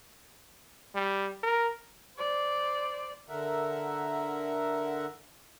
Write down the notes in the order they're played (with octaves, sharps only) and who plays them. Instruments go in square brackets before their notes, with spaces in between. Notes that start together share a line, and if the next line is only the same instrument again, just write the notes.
[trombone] G3
A#4
[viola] C5 D5
[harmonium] D3 A#4 E5 F#5